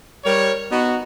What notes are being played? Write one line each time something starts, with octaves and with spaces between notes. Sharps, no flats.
G3 A#4 C#5
B3 D#4 F#4